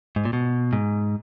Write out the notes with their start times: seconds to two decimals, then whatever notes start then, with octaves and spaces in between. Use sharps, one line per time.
0.16 G#2
0.25 A#2
0.33 B2
0.73 G#2